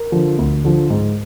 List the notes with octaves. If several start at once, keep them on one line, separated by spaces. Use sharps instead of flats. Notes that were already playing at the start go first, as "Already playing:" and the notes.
Already playing: A#4
D3 F3
D2
D3 F3
G#2